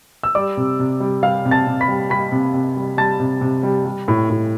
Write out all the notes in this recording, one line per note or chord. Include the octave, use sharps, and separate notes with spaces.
E6
G3 D5 D6
C3
C3
G3
G3 F5 F6
C3
A5 A6
C3
B5 B6
G3
G3 B5 B6
C3
C3
G3
G3 A5 A6
C3
C3
G3
G3
A2
A2